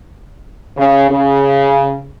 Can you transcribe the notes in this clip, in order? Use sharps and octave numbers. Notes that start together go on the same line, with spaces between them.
C#3
C#3